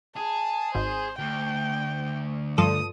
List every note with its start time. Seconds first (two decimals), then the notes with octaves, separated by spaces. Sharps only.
0.16 G#4 A5
0.75 G#1 C5
1.19 D2 G5
2.58 G2 F3 A4 D#6